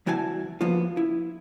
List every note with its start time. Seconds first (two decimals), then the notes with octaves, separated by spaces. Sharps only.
0.06 C2 E3 E4 F#4 G#5 A5
0.61 F3 A#3 B3 F4
0.97 E4